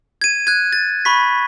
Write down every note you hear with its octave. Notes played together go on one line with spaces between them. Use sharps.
G#6 D#7
F#6 G#6
A6
B5 C#6 B6